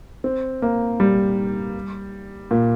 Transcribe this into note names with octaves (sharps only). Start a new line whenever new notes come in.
C4
A#3
G3
A#2